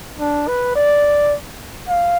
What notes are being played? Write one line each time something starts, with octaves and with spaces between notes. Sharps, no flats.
D4
B4
D5
F5